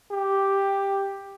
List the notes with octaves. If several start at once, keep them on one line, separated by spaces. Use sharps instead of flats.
G4